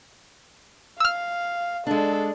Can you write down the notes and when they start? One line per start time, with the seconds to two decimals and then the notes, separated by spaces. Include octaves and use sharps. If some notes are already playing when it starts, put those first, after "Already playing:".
1.00 F5 E6 F6
1.87 G#3 D4 A4